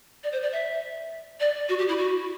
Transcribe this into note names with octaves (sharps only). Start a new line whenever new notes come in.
D5
C5
D5
E5
D5
F#4
G4
E4
F#4